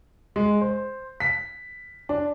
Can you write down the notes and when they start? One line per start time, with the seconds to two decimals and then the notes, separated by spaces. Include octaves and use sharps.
0.36 G#3
0.61 C5
1.20 B6
2.09 D4